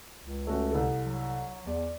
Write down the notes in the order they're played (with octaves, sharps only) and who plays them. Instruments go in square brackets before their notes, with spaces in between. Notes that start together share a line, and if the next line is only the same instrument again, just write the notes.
[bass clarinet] C#2
[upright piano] A3 C#4 F#4
C2 A4
[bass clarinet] F#3
[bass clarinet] E2 [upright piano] D5